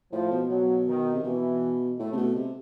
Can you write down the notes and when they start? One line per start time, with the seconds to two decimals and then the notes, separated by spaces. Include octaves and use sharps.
0.11 A2 F3
0.31 B2
0.49 B2 F#3
0.87 D#3
1.14 C3
1.24 B2 E3
1.99 A2 A3
2.12 C3
2.17 B2
2.36 C3